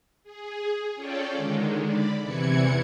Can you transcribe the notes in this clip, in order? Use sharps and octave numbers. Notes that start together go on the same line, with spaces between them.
G#4
C#4 F4 A4 C#5 D5 G5
D3 D#3 G#3
D5 B5
E2 C3 E3 E4 G#6 C#7